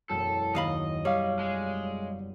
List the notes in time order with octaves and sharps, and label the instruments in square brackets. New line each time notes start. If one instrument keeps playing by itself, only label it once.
[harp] E1 F#2 A5 [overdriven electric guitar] A4
[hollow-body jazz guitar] D#2 F5 B5 [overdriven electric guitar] D#5
[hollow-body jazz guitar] G3 [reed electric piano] C#5 F5
[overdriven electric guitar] G#3